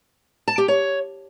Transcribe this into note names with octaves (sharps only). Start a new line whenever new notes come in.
A5
G4
C#5